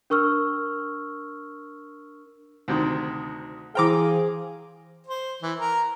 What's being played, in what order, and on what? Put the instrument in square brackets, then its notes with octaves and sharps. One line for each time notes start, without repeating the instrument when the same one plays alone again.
[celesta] D4 A#4 C#6 E6 F6
[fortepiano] D2 C3 D#3
[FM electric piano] E3 C5 F5 [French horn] G#4 [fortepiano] G5 A#5 D6
[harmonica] C5
E3
A#4